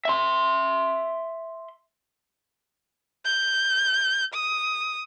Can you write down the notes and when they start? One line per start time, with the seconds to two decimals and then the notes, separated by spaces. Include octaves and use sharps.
0.05 E5 C6
3.25 G6
4.34 D#6